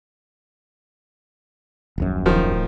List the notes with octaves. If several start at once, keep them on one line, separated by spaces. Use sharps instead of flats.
D#1 A#1 F#2
D1 D#3 F3